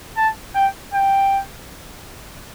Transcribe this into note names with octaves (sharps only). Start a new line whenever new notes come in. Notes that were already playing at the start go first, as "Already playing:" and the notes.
A5
G5
G5